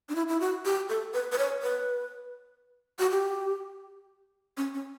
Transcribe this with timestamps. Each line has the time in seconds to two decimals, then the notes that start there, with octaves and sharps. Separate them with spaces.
0.09 D4
0.15 E4
0.28 E4
0.40 F#4
0.65 G4
0.89 A4
1.14 B4
1.32 B4
1.38 C#5
1.63 B4
2.99 F#4
3.10 G4
4.57 C#4
4.74 C#4